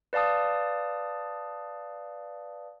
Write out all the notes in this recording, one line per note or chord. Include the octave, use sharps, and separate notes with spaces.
B4 D5 F5 A5 D#6